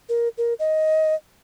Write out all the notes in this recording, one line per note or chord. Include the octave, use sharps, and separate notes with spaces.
A#4
A#4
D#5